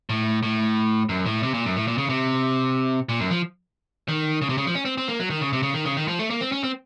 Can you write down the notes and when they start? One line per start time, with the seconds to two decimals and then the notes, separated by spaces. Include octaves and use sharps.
0.09 A2
0.43 A2
1.09 F#2
1.26 A2
1.43 C3
1.54 A#2
1.66 F#2
1.76 A2
1.88 A#2
1.98 C#3
2.09 C3
3.09 A#2
3.20 F#2
3.31 F3
4.08 D#3
4.42 C#3
4.49 C3
4.58 C#3
4.67 F3
4.75 C#4
4.85 C4
4.98 C4
5.08 A#3
5.20 F#3
5.30 D#3
5.41 C#3
5.53 C3
5.63 C#3
5.74 D#3
5.85 C#3
5.97 D#3
6.08 F3
6.19 A3
6.30 A#3
6.41 C4
6.52 C#4
6.63 C4